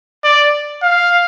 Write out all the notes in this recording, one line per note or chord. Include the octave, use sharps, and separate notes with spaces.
D5
F5